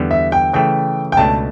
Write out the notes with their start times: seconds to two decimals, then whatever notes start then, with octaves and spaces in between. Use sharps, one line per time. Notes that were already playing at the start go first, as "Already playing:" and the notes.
Already playing: E2 D3 G3 B3
0.11 E5
0.32 G5
0.53 C#3 E3 A3 G5
1.12 G5
1.17 C#2 B2 A3 D4 A5